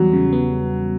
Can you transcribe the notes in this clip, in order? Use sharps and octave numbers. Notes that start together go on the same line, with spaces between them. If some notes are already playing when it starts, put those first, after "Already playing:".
Already playing: E2 F#3 G3
C#3
B3